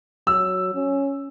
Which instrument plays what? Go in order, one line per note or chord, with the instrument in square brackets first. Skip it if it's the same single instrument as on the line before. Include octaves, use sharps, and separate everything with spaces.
[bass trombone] F#3 [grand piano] E6
[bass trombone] C#4